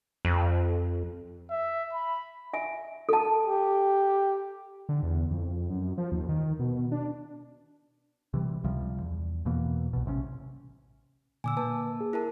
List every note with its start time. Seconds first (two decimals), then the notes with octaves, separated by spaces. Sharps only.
0.25 F2
1.50 E5
1.93 B5
2.53 E5 G#5
3.09 A4 A5
3.46 G4
4.89 D3
5.03 E2
5.31 F2
5.69 F#2
5.98 F3
6.12 D#2
6.29 D#3
6.59 B2
6.92 D4
8.34 C3 E3 G3
8.64 C#2 C3 F3 G3
9.00 E2
9.45 E2 B2 E3 A#3
9.93 C2 B2
10.06 A1 C3 F#3 C#4
11.44 A#2 D3 G#5 D6 E6
11.57 A#3 B4 A5
12.01 G#4
12.13 E4 A#4 A5